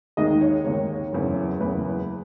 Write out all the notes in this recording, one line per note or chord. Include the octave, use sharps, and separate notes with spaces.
D#2 D#3 G#3 D#5
C#5
D#2 D#3 G#3 C#5
F#1 E2 C#3
F#1 E2 C#3 B4